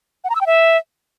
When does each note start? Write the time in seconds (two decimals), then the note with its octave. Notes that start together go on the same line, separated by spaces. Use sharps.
0.24 F#5
0.30 A#5
0.35 E6
0.41 G5
0.46 E5